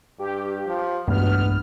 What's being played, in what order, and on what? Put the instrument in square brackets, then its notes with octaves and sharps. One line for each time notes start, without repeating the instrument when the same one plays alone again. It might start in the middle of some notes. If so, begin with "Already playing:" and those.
[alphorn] G2 [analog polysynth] G4
[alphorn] F3
[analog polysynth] B1 F6 [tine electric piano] E2 G#3 A3 [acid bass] G2 [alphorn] B3